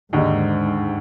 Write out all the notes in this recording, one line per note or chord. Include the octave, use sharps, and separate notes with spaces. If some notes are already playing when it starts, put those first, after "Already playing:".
D#2 G#2 D3 G#3 D#4